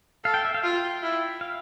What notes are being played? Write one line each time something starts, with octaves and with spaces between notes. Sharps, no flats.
A4 F5
G5
E5
F5
F4 G5
E4
F5